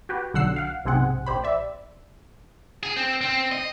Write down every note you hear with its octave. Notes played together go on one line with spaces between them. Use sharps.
F#4 G4 B4
B1 D3 F#3 F#5 E6 C7
F5 F#5
B1 G#2 C3 C4 G#4 F#5
A#1 G4 C5 B5
D5 E5
G#4
C4
C4
D#5